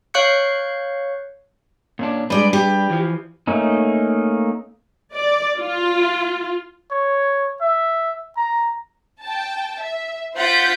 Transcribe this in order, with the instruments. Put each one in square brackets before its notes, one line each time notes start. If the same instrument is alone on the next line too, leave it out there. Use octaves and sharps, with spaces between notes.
[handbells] C#5 F5 C#6 F#6 G6 C#7
[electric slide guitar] A#2 C#4 D4
[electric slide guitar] G3 D4 B4 [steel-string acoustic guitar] G#3 D5
[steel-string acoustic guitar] G4
[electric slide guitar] E3 F3
[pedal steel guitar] A3 A#3 C#4 D#4
[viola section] D5
F4
[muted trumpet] C#5
E5
A#5
[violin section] G5 A5
E5
F4 C5 F#5 G6 A6 B6